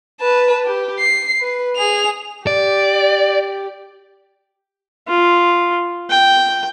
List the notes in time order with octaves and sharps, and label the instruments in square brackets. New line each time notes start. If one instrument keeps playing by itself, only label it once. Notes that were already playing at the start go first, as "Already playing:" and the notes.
[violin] B4 A5
G4
C7
B4
G#4 F7
[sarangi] G4 [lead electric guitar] D5
[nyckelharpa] F4
G5